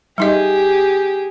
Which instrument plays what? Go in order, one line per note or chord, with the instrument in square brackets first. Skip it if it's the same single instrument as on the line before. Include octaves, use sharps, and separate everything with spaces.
[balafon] G3 D#4 D#5 [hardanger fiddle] G4 G#4